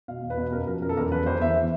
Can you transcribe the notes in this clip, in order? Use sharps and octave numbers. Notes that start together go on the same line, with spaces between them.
B2 F5
E2
B4
B2
F#2 A#4
F3 A#4
F#2 A#4
A4
E2 A#4
E2 B4
E2 C5
E3 E5
E3